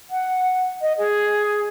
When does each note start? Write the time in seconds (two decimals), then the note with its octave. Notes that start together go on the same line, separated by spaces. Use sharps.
0.09 F#5
0.81 D#5
0.97 G#4